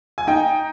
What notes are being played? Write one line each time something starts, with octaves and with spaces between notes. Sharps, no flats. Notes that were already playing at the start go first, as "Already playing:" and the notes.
G#5
D#4 G5